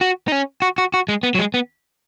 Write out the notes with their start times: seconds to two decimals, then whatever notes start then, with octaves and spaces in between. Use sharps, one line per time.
0.01 F#4
0.28 D#4
0.32 C#4
0.62 F#4
0.78 F#4
0.94 F#4
1.09 G#3
1.23 B3
1.35 F#3
1.39 G#3
1.54 B3